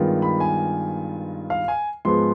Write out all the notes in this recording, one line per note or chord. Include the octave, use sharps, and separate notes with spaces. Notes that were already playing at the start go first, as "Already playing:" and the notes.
Already playing: G2 D#3 G#3 B3 F4
B5
G#5
F5
G#5
G#2 F3 G#3 B3 C6